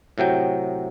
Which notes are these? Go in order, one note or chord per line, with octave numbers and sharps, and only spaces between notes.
A2 C3 F#3 G5